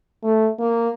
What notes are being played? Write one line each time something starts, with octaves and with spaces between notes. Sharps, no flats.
A3
A#3